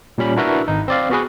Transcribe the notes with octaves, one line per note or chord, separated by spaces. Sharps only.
A#2 G3 C#4 B5
D4 E4 F#4 A#4 B4 E5
G#1 D#4
C4 D5 F5
B3 F#4 G#4 B4